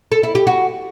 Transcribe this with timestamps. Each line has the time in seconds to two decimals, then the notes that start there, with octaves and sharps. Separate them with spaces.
0.12 A4
0.23 E4
0.35 G4
0.47 F#4